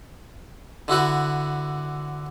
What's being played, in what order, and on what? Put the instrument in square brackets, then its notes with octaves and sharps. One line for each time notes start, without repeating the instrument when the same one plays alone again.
[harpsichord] D3 E4 F#4 B4